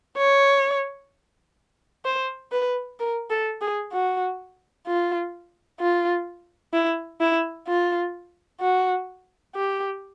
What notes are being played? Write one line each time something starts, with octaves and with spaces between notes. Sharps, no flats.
C#5
C5
B4
A#4
A4
G#4
F#4
F4
F4
E4
E4
F4
F#4
G4